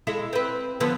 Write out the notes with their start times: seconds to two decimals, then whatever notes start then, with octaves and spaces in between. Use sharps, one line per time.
0.07 G#3 E4 A4
0.33 C4 B4
0.80 D3 F3 B3